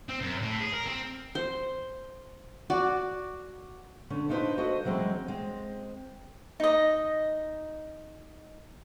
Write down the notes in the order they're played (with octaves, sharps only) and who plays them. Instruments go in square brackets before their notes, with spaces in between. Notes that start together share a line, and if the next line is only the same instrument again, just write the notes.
[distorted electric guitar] C4
F#2
A2
G#4
A#4
C4
[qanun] C5
F#4 D5
[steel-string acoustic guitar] D3 A3 C#4
D4 D#4 F4 G4 B4 C5
F#4 A4 C5 D#5
E3 F#3 G#3 C4 C#4
G#3 C4
[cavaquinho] D#4 D#5